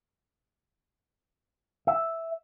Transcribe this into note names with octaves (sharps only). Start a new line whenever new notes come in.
E5